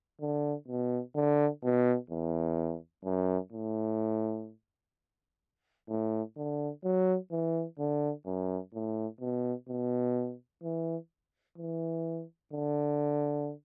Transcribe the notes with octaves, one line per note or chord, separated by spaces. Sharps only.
D3
B2
D3
B2
E2
F#2
A2
A2
D3
F#3
E3
D3
F#2
A2
B2
B2
E3
E3
D3